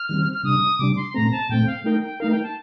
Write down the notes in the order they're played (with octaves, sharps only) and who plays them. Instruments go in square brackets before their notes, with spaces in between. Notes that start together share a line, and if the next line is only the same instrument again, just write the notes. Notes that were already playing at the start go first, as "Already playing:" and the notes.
Already playing: [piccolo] F6
[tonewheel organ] D#3 G3 C4
[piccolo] F6
[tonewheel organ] C3 G3 D4 [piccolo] D#6
[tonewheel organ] C3 G3 D4 [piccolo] D6
[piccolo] C6
[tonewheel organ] A#2 A3 C4 [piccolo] A#5
[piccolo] A5
[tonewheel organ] A#2 A3 C4 [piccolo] G5
[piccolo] F5
[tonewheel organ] A3 D#4 A#4 [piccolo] G5
[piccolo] G5
[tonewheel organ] A3 D#4 A#4 [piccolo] F5
[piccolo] G5
A5